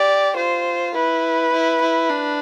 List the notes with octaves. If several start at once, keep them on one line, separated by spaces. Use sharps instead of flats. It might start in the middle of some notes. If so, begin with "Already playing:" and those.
Already playing: G4 D5
F4 C5
E4 B4
E4
E4
D4